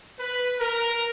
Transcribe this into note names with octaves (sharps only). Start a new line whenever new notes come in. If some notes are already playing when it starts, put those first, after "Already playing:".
B4
A#4